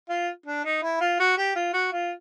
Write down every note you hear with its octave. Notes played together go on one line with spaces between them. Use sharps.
F4
D4
D#4
E4
F4
F#4
G4
F4
F#4
F4